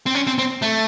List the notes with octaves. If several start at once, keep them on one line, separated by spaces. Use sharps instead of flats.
C4
C#4
C4
C4
A3